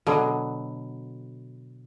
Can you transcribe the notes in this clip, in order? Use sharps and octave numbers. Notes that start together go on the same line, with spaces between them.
B2 D3 F#3